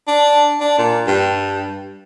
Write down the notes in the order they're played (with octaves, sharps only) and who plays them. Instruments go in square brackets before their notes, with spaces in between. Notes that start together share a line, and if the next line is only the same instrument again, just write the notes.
[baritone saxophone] D4
D4
A#2
G2